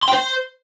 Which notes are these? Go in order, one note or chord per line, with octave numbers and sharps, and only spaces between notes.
C6
G5
C5